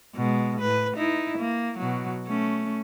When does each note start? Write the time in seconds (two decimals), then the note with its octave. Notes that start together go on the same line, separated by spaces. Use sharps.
0.15 B2 G#3
0.59 A2 B4
0.95 D#4 E4
1.38 A#3
1.78 B2 F#3
2.27 A3 C#4